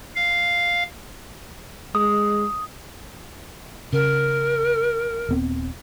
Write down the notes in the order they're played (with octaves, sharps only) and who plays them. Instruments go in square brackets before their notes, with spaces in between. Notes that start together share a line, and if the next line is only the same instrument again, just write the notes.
[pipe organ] F5
[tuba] G#3 [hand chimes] D#6
[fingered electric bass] C#3 [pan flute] A#4
[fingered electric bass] D#1 B3 C4